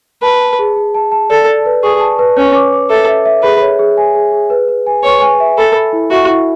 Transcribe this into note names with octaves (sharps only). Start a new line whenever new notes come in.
B4 A5
A5
G#4
G#4
A5
A5
A4 D5
D5
B4
G#4 C#6
A5
B4
C#4 C#5
D6
D6
A4 E5
E5
E5
G#4 B4
C#5
G#4
G#5
G#4
G#4
B4
B4
G#5
B4 C#5
G#5
E5
A4 B5
B5
E4
F#4 E5
E4